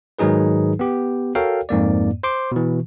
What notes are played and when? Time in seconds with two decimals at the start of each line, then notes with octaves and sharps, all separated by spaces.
0.19 G#2 D#3 F#3 D#4 G#4 B4
0.79 B3 G4
1.35 F#4 A4 A#4 C#5 F5 G5
1.69 F2 G#2 A#3 D5
2.23 C5 C6 D6
2.52 B2 E3